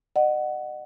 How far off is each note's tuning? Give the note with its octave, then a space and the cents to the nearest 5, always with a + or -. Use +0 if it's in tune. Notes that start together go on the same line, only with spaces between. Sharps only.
D#5 -40 F#5 +5